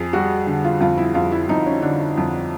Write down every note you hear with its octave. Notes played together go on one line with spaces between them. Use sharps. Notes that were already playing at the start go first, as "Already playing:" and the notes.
Already playing: F2 G#4
G3 F#4
D3
F4
F2 F4
E4
F2 F4
E4
F2 D#4
C#4
D3 D4
F2